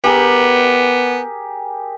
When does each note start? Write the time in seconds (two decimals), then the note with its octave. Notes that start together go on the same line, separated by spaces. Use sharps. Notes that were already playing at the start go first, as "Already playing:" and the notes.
0.04 B3 G4 G#4 A#4